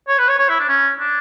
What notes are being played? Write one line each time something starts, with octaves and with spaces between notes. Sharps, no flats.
C#5
B4
C#5
C#5
E4
D4
C#4
D4